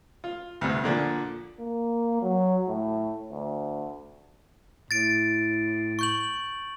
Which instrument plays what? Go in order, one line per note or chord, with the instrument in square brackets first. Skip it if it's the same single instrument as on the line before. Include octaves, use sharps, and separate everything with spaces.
[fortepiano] F4
D2 G2 C3
A#2 D3 F3
[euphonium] A#3
F#3
A2
D2
[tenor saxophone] A2 [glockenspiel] A6 D7
[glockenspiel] C#6 G6 F#7